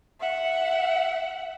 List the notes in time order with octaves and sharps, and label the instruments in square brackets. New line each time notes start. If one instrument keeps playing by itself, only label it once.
[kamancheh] E5 F#5